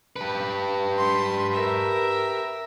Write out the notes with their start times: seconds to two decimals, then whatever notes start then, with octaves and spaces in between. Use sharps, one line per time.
0.16 G4 B4
0.97 C6
1.53 A#4 E5